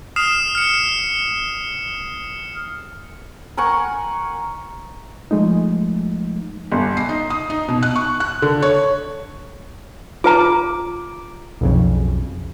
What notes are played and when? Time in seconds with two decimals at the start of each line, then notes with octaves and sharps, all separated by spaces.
0.16 D#6 F6 C7 E7
0.55 F6 C#7
3.57 A#4 F#5 G#5 C#6
5.31 F3 G#3 A3 D#4
6.72 G1
6.97 C7
7.09 D#4
7.30 D#6
7.50 D#4
7.69 B2
7.83 F#6
7.96 C#6
8.20 F#6
8.42 D3
8.62 C#5
10.24 F4 B4 A#5 D6
11.61 B1 F2 C#3